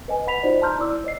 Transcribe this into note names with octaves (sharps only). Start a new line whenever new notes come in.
B4 D#5 G#5
B4 F#5 B5 B6 F7
D#4 F4 F#4 C5 D5 D#5
A5 A#5 C6 F6 G6
E4 D5 D6 E6
C#5 D#5 C7